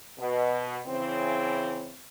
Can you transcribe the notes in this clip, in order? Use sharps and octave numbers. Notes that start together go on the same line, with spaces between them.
B2
C#3 E3 C4